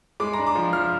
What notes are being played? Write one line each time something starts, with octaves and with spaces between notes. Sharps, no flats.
G#3 D6
A#5
D4
D6
F3
F3 F6